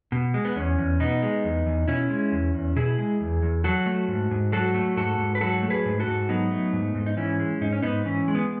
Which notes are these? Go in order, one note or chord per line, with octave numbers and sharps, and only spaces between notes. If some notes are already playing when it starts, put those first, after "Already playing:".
B2
G#3
B3
E2 C#4
E2
B2 B3 D#4
G#3
E2
E2
B2 C#4 E4
G#3
E2
E2
B2 E4 G#4
G#3
E2
E2
F#3 F#4 A4
A3
G#2
G#2
F#3 F#4 A4
A3
G#2 F#4 A4
G#2
B4
F#3 F#4 A4
A3
G#4 B4
G#2
F#4 A4
G#2
F#3 B3 D#4
A3
G#2
G#2
D#4
E3 C#4 E4
G#3
G#2 D#4
C#4
G#2 B3 D#4
E3 C#4
G#3
B3